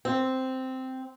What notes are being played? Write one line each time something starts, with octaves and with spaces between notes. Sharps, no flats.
C4